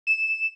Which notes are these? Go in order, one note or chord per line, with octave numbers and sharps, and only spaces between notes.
E7